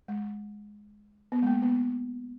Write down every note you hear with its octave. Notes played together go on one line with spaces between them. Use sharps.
G#3
B3
G#3
A#3
B3